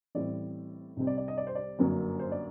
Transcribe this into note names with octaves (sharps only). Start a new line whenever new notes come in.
A1 A2 G3 C4 D5
C2 C3 G3 C4
D5
D5
D#5
D5
C5
D5
G1 F#2 F#3 A#3
C5
D5